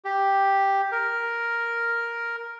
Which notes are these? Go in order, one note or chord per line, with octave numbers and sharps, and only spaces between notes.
G4
A#4